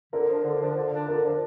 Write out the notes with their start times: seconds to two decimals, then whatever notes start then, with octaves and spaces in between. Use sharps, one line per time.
0.13 D3 A#4
0.28 F3 D4
0.44 D3
0.60 F3 D4
0.77 D3
0.92 F3 D4
1.08 D3 A#4
1.23 F3 D4